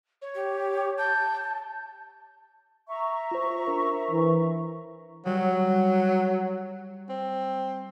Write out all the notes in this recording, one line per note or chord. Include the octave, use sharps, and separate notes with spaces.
C#5
G4
A5 G6
E5 A#5 C#6
F4 C5
D4 A#4 C5
E3
F#3 G3
C4